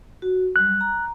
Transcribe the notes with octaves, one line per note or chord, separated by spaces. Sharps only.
F#4
F#3 G3 F#6
A#5
A#5